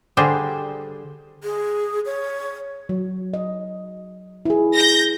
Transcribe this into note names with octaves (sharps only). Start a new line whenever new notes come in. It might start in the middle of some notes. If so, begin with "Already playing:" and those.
D3 G3 D4 G#4 C5
G#4
C#5
F#3
D#5
E4 G#4
G6 A#6